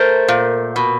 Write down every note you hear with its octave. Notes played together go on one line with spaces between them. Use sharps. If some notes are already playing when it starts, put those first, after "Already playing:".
Already playing: A3 A#4 C5
A#2
B2